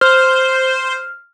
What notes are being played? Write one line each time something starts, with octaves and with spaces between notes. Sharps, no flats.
C5 F6